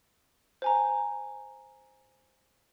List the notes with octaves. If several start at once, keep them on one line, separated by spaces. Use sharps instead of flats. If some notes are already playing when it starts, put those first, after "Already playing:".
C5 G#5 A#5